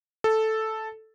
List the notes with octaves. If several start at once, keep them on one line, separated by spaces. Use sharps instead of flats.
A4